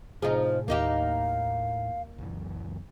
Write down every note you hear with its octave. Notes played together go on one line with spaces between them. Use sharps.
A2 C3 F3 D#4 G#4
D#2 A#3 D#4 G4 F5
C#2 F#2 E3